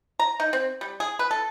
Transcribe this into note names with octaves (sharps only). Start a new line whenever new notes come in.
A#5
D#4
C4
G3
G#4
B4
A4